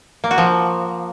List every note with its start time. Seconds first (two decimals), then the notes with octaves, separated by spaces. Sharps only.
0.24 A#3
0.31 F#4
0.38 F3